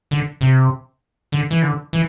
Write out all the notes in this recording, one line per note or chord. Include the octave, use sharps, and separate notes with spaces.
D3
C3
D3
E3
D3
E3